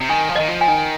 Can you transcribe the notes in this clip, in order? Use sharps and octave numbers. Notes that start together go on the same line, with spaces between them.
C3
D#3 G#5
F3
D#3 D#5
F3
G#5
D#3